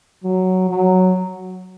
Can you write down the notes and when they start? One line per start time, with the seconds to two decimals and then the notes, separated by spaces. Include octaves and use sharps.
0.24 F#3
0.69 F#3